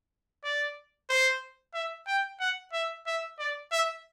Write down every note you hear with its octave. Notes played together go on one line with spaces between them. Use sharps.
D5
C5
E5
G5
F#5
E5
E5
D5
E5